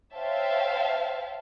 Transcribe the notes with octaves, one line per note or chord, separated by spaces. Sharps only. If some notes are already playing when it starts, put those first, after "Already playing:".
C5 C#5 E5 F5 G5 A5